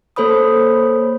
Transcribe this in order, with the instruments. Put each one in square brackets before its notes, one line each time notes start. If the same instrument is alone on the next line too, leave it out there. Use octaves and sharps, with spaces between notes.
[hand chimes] A#3 A4 C5 C#5 B5 D#6